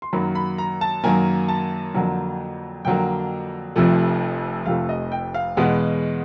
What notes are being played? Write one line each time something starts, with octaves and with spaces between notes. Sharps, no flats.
C6
F#2 D#3 F#3 A#3 B5
B5
A#5
A5
F#2 D#3 F#3 A#3 G#5
A5
F2 D3 F#3 A#3
F2 D3 F#3 A#3 G5
F1 F2 C3 F3 A3
F1 F2 C3 F3 A3 F5
D#5
G5
F5
E2 B2 G#3 B3